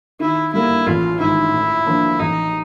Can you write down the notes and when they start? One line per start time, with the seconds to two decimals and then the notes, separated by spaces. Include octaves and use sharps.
0.20 D#3 E4
0.53 G3 A#3 E4
0.86 A1 F4
1.20 G#2 D#3 E4
1.52 A2
1.86 F3 A#3 D4
2.19 A1 D#4